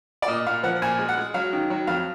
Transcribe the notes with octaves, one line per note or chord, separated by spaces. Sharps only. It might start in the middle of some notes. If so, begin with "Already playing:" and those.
D5
A#2 D#5
A#2 F5
F3 F#5
A#2 G#5
G#3
F#5
G#3
F#3 F5
D#3
F#3
F2 F5